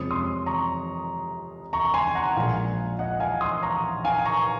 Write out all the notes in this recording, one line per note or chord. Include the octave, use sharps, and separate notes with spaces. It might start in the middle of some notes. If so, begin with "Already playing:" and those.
Already playing: F2 C3 F3 G#3 C#4 D#6
C6 D#6
A#5 C#6
A#5 C#6
G#5 C6
F#5 A#5
A#1 A#2 G#3 F5 G#5
D#5 F#5
F5 G#5
C6 D#6
A#5 C#6
F5 G#5
A#5 C#6